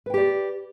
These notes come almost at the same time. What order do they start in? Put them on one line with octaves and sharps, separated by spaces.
B4 G5 G4 D5